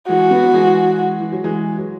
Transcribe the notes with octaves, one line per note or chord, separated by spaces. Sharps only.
E3 G#3 F#4
F#3 B3
E3 G#3
E3
F#3
E3 G#3
F#3